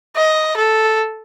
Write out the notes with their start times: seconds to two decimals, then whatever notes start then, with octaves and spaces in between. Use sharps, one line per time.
0.16 D#5
0.57 A4